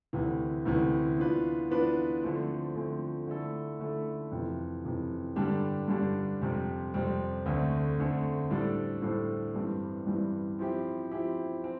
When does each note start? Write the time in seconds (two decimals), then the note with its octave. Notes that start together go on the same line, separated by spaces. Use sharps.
0.13 D2 C3 E3
0.66 D2 C3 E3
1.18 E3 B3 D4 F4 B4
1.71 E3 B3 D4 F4 B4
2.23 D3 F3 A3 C4
2.75 D3 F3 A3 C4
3.27 D3 A3 E4 A4
3.79 D3 A3 E4 A4
4.32 F2 C3 E3
4.85 F2 C3 E3
5.36 G2 D3 G3 D4 G4
5.88 G2 D3 G3 D4 G4
6.42 F2 C3 G3 C4
6.94 F2 C3 G3 C4
7.46 D2 D3 A3 C4
7.98 D2 D3 A3 C4
8.50 A2 G3 D4 A4 C5
9.02 A2 G3 D4 A4 C5
9.54 G2 E3 G3 C4
10.07 G2 E3 G3 C4
10.59 F3 C4 E4 G4
11.11 F3 C4 E4 G4
11.64 C4